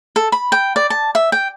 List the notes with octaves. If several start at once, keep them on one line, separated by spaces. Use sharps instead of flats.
A4
B5
G5
D5
A5
E5
G5